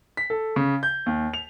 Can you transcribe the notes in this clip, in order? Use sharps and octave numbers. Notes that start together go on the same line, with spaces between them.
B6
A4
C#3
G6
D#2
F7